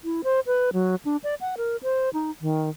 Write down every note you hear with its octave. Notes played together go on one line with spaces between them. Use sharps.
E4
C5
B4
F#3
D4
D5
F#5
A#4
C5
D#4
D#3